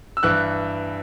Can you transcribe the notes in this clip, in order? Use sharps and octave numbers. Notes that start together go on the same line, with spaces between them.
E6
G2 E3 F#6